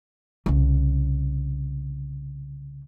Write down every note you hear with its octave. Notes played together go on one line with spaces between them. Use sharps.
C2 C#3